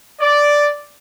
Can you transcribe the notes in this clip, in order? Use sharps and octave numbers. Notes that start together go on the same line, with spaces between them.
D5